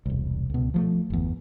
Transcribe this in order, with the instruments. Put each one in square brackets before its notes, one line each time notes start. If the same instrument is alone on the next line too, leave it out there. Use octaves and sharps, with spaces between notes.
[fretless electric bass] E1 C2
C#2 B2
F3 G3 A3
G1 E2